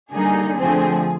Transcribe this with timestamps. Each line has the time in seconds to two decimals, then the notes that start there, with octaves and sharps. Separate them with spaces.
0.12 D3 G3 A#3 D#4 G#4
0.56 D3 F3 A3 C4 G#4